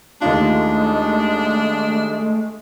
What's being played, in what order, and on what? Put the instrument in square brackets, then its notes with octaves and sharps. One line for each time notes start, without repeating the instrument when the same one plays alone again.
[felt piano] D#2 D#4 F4 [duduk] G#3 [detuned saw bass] A3 [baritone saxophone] D4